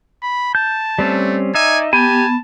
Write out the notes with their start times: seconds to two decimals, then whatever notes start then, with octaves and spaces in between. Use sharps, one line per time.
0.23 B5
0.55 A5 G6
0.99 G3 A3 C4 C#4
1.54 D#4 D5 E5 G#5
1.93 B3 G4 G#5 A5